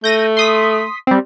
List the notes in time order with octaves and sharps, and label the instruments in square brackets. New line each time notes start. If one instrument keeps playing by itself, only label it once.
[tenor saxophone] A3 [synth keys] G6 A#6 D#7
[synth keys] C6 D#6 B6
G3 C4